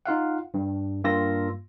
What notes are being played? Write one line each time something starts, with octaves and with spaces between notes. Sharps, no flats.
D#4 F4 F5 F#5
G2
G2 A#3 F4 C6 E6 A#6